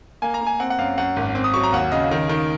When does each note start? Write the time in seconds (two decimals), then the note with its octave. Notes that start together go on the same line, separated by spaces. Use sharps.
0.22 A#3 G#5
0.34 A#5
0.41 A#3
0.47 G#5
0.60 C4 F#5
0.70 F#5
0.78 F#2 F5
0.97 F#2 F#5
1.16 G#1
1.35 C4
1.44 D#6
1.54 F#3 C#6
1.63 A#5
1.73 D#2 F#5
1.92 C#3 D#5
2.11 D#3
2.29 D#3